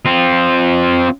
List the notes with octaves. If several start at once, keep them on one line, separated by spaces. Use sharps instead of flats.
C4 F4